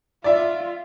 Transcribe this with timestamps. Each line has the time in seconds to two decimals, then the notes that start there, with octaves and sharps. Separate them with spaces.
0.24 F4 D5 E5